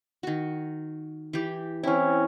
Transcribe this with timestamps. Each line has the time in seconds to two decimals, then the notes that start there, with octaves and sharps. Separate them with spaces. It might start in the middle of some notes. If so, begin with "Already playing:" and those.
0.23 D#3 F#4
1.33 E3 G4
1.83 E3 C4 C#4 E4